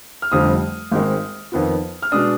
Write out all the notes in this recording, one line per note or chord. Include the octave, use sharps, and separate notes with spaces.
F6
F1 F2 D3 G3 C4 D#6
G#1 G#2 D#3 G#3 C4
F2 D#3 B3 F4
F6
B2 G#3 D4 D#6